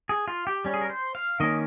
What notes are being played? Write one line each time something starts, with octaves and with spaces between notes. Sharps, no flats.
G#4
F4
G4
G3 C#4
G#4
A#4
C5
F5
D#3 A#3 C#4 D#5